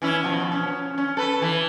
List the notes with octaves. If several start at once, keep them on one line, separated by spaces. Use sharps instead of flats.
E3 C#4 E4
B2 F3
C#4
C#4
A4 B4
E3